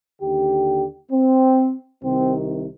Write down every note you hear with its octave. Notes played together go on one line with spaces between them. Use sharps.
D#2 D3 G4
C4
C2 C3 D#3 C4